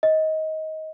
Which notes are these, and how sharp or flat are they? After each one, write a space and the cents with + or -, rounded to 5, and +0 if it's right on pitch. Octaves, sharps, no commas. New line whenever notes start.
D#5 +20